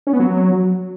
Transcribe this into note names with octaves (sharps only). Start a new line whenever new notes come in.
C#4
B3
F#3